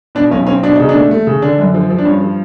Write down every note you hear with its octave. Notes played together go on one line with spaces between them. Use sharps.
B2 D4
B1 C#4
C4 C#4
B2 D4
C#3 D#4
D4
A3
A3
C#3
D3 D4
F#2
F3
F3
D4
G2 C#4
F3